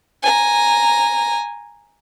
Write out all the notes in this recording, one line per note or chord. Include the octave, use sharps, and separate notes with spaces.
G#5 A#5